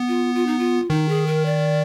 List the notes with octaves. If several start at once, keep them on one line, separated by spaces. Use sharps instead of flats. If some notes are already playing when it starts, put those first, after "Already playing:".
Already playing: B3
F4
F4
D#4
F4
D#3 D#4
G#4
A#4
D5